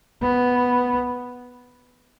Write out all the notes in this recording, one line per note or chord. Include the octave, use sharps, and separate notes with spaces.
B3